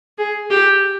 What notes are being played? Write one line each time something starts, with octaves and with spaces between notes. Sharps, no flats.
G#4
G4